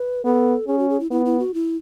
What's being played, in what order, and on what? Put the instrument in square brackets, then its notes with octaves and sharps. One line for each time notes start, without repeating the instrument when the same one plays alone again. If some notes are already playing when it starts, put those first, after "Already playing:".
Already playing: [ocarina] B4
[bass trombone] B3 [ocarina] A4
[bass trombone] C#4 [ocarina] G#4
[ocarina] F#4
G#4
E4
[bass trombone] B3 [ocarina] E4
[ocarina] E4
F#4
E4